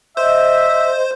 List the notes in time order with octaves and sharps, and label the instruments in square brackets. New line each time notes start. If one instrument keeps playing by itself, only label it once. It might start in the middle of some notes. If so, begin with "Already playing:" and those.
[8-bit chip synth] C5 [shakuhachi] D#5 [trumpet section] E5